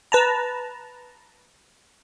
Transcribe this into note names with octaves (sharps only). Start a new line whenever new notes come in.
B4 A5 A#5